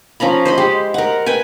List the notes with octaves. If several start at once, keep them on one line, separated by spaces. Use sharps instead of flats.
F3 C#4 A#5 B5
C5 D#5 B5
G#3 G4
A#4 F#5
B4 G5 G#5